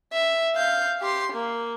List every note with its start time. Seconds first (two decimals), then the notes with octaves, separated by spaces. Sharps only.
0.12 E5
0.55 F5 G6
1.01 G4 C6
1.32 A#3